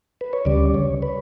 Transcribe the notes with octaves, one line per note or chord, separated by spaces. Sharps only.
B4
C#5
D2 C#3 G3 D5
C#5
B4